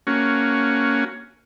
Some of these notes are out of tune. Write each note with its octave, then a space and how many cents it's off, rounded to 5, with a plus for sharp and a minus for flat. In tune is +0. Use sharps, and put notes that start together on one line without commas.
A#3 +0 C#4 +10 F#4 +0